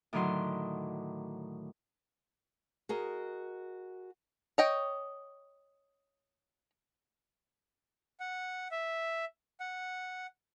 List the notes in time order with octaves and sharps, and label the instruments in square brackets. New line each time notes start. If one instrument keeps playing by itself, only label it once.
[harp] A2 D3 D#3 F#3 D#4 C6
[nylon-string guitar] F#4 G#4 A#4 D#5
[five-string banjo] C#5 D#5 G5
[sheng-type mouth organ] F#5
E5
F#5